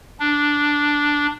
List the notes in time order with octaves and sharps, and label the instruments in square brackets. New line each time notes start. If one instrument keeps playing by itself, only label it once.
[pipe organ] D4